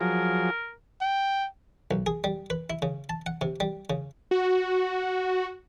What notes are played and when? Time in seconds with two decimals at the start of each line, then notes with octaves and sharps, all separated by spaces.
0.01 F3 F#3 G#4 A#4
1.01 G5
1.91 B1
2.06 G#4
2.24 G3
2.50 B4
2.70 E4
2.82 C#3
3.09 A5
3.26 F#5
3.41 C3
3.60 G3
3.90 C#3
4.31 F#4